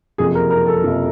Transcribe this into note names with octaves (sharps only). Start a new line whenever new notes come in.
F#1 F2 C3 F3 G#4
A#4
A#4
A4
F#1 F2 C3 F3